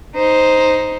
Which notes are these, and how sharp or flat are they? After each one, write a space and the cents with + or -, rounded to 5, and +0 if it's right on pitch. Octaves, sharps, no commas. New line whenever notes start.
D#4 +0 C5 +0